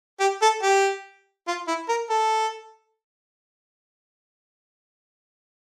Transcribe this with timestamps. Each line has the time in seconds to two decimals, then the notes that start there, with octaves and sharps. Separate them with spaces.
0.20 G4
0.42 A4
0.63 G4
1.47 F4
1.68 E4
1.89 A#4
2.09 A4